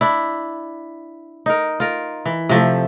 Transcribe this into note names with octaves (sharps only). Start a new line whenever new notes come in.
D4 E4
D#4 A#4
F4 A#4
E3
C3 F3 A3